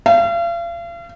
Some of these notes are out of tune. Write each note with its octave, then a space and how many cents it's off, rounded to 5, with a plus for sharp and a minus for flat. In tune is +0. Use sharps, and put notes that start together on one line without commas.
F5 -40